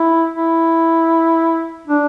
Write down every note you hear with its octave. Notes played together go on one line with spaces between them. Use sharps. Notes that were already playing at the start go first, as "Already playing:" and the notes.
Already playing: E4
E4
D4